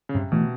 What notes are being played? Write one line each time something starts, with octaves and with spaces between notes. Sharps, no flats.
C#3
G2 C3
B2 E3 A3